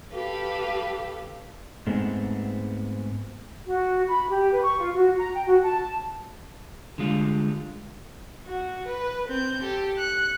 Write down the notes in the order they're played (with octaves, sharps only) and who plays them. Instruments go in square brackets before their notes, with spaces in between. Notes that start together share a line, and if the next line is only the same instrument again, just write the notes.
[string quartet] G4 A4 B4 F5
[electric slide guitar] G#2 G#3 A3 B3 C4
[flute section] F#4
B5
G4
B4
C#6
F4
F#4
A#5
G5
F#4
A5
[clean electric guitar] D3 G3 G#3 F4
[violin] F#4
B4
C4 G6
G4 A4
F#6 C#7